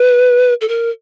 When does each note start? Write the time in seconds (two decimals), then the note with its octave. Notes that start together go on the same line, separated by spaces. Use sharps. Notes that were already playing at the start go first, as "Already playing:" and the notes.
Already playing: B4
0.61 A4
0.68 A#4